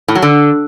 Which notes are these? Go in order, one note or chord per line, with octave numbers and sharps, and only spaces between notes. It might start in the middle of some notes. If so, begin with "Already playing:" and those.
A2
F#3
D3